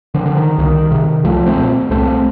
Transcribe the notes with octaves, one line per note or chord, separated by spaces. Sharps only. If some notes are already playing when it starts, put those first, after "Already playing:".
D3 F3
D3
D#3
C2 D#3
C3
C2 F3 A3
A3 C4
A#2
C2 A3 C4